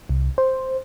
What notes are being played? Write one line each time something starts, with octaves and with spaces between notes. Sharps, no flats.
C2
C5